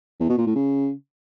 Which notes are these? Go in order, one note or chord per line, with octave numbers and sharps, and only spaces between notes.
E2
B2
A#2
A2
C#3